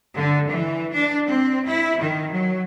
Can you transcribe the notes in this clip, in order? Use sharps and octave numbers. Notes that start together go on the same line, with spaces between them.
D3
E3
D4
C4
E4
D#3
F#3